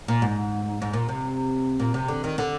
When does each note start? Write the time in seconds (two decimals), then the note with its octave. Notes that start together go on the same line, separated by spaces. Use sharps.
0.08 A#2
0.22 G#2
0.82 G#2
0.93 A#2
1.09 C3
1.79 A#2
1.94 C3
2.08 D3
2.24 D#3
2.38 D3